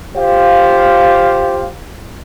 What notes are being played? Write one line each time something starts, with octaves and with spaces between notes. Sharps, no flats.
F4 G4 C5 F5